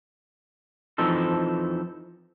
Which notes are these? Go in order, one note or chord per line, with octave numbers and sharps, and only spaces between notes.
E3 F3 C4 D#4 A4